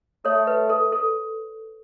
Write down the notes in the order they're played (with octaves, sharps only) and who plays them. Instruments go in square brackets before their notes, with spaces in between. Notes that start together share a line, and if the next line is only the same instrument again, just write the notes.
[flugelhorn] A3 [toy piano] A4 C#5
[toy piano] B4
A4
A4